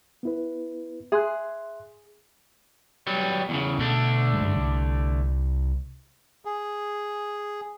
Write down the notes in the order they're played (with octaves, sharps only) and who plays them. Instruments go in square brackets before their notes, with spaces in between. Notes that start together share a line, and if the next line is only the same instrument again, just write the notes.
[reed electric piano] B3 E4 B4
[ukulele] G#4 [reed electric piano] E5 C6 F#6
[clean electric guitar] F#3 G3 B3
E2 A#2 C#3
[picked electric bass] B2 [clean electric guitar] D3 A3 D4
[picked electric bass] F#1 G2 G#3
C2
[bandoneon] G#4